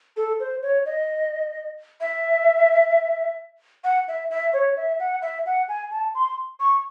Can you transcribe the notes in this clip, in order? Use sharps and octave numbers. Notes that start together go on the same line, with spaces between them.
A4
C5
C#5
D#5
E5
F#5
E5
E5
C#5
E5
F#5
E5
F#5
G#5
A5
C6
C#6